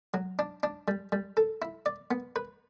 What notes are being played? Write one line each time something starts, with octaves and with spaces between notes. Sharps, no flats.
F#3
D4
D4
G3
G3
A4
E4
D5
B3
B4